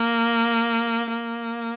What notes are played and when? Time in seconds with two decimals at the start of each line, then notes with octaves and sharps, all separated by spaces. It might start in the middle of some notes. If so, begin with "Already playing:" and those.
Already playing: A#3
1.09 A#3